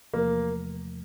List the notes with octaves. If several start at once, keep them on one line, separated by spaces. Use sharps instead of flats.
E2 C3 F3 A3 A#3